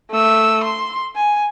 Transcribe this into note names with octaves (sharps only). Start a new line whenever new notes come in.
A3 E6
C6
G#5